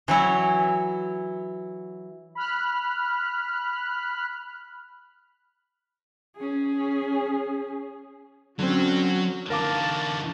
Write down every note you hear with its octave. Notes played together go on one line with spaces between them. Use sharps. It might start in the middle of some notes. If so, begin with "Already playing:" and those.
E3 F#3 E4 C#5
B5 F6 F#6
C#4 G#4
D3 F#3 C4 C#4 F#4
D3 E3 A#4 F5 A5 D6